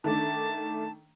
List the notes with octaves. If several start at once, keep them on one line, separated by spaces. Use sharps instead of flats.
D#3 A3 D4 A5